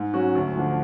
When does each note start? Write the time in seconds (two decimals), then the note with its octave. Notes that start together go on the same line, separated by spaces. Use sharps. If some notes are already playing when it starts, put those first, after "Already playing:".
Already playing: G#2
0.13 F#3 C#4 F#4
0.35 D2
0.55 D3 F3